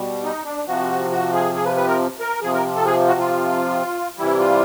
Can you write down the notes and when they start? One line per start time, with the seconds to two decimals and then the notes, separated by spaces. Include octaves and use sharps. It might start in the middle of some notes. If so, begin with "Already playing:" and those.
Already playing: B2 G3
0.24 D#4
0.45 D4
0.67 C3 F3 F#4
1.11 F#4
1.33 G#4
1.55 G#4
1.66 B4
1.76 B4
1.88 A#4
2.20 A#4
2.42 C3 F3 G#4
2.54 A#4
2.75 A4
2.86 G#4
3.08 F#4
3.20 F4
4.18 C3 E3 G3 E4
4.39 F4